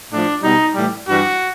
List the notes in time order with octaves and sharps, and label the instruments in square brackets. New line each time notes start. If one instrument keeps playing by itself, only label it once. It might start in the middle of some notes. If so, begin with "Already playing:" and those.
[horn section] A2 F3 D4
B2 G3 D#4
A2 E3 G3
G2 E3 G3 F#4